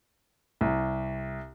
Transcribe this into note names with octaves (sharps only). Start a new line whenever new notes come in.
C2